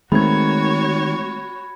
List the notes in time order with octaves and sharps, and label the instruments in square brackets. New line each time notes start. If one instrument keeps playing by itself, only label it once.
[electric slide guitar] D#3 [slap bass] G#3 A3 C4 [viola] F#4 C#5 [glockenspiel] B5 G#6